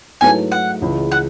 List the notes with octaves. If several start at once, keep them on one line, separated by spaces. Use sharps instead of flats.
G#2 F#3 A3 E4 B4 G#5
F#5
C#2 C#3 E3 G#3
F#5